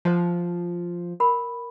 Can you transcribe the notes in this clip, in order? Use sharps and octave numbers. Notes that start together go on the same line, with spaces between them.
F3 C5 F#5 A5
A#4 F#5 B5